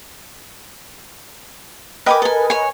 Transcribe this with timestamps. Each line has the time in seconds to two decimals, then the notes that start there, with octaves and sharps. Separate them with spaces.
2.06 A#4 B4 D#5 G5 G#5 D6
2.22 A4 G#5
2.50 C#5 G#5